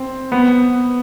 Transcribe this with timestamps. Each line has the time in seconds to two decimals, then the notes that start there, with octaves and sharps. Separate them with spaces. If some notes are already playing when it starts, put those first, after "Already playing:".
Already playing: C4
0.32 B3